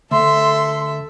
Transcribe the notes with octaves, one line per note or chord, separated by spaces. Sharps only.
D2 A4 E5 C6